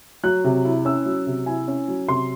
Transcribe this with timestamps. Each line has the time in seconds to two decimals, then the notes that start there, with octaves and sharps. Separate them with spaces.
0.23 F#3 F#6
0.44 C3
0.65 E4
0.85 C#4 E6
1.06 F#3
1.27 C3
1.46 E4 G#5
1.68 C#4
1.88 F#3
2.08 C3 C6